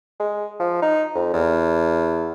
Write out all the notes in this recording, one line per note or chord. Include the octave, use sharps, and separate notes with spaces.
G#3
F3
D#4
F2
E2